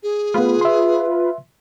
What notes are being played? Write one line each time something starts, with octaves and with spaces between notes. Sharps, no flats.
G#4
A3 B3 F4 B4
E5 C6